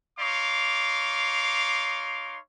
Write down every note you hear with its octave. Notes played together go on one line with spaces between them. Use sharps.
D#4 C#5 F5 C6 D6